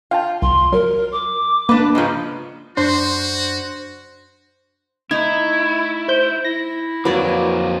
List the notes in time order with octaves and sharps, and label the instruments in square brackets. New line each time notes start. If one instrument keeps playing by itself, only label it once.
[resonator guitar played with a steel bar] F4 [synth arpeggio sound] F5 G5 A5
[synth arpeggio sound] C2 [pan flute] C6
[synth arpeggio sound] F#3 [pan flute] A#4
[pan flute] D6
[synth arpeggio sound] A#3 [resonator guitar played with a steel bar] D4 B4
[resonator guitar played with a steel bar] G#2 C#3 F3
[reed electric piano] F#2 D4 [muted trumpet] F#4 [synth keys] C5
[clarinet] A3 [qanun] D#4 [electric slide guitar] E4 [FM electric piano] G#6
[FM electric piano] C5 G6
[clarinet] E4 [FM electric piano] A#6
[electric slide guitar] F2 A#3 [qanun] F#3 D5 [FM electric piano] B4